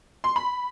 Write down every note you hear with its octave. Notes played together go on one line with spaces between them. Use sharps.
C6
B5